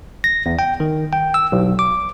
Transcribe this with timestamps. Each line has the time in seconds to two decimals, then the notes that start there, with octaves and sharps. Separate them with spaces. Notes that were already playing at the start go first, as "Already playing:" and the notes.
0.24 A#6
0.46 E2
0.59 G5
0.80 D#3
1.13 G5
1.34 E6
1.52 B1
1.79 D6